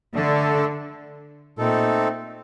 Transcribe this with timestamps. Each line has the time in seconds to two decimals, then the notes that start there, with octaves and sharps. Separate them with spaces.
0.15 D3 A3 D4 A4
1.58 A#2 A3 C4 D#4 A4